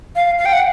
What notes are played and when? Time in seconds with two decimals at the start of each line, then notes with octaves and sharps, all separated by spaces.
0.16 F5
0.38 F5
0.45 G5
0.53 F#5